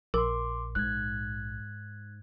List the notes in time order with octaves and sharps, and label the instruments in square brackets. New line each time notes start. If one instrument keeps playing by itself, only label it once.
[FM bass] A#1 [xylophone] A#4 [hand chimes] C6 D6
[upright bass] G#2 [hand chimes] F#6 G#6